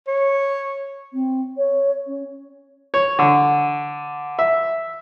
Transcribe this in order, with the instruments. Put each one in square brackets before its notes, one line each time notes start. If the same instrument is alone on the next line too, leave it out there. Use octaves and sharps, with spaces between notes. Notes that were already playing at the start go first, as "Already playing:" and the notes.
[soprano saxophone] C#5
[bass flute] C4
C#5
C#4
[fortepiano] C#5
D3
E5